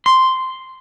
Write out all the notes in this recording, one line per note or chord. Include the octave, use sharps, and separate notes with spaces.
C6